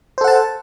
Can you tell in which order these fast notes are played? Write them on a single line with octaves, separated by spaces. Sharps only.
C5 A4 F#5 A5